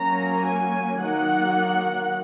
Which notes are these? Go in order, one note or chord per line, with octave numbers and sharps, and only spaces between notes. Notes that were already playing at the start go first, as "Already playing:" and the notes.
Already playing: F#3 A#3 C#4 A#5
G#5
D#3 F#3 A#3 F#5